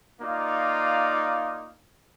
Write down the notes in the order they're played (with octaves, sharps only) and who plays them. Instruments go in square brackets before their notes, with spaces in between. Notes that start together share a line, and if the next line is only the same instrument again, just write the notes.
[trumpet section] A#3 D#4 F4 D5 F5